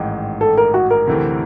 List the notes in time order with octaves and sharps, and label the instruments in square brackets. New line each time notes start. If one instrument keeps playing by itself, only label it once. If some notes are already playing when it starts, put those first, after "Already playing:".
Already playing: [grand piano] A1 G#2 D#3
[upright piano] A4
A#4
F#4
A#4
[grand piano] D2 C3 E3 A3 C4